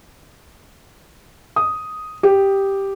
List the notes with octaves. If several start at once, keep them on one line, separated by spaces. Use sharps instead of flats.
D#6
G4